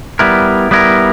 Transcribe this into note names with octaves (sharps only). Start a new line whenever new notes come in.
G3 B3 E4 A#4
G3 B3 E4 A#4